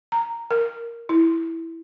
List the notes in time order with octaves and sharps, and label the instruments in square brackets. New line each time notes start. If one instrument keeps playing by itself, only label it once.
[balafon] A#5
A#4
E4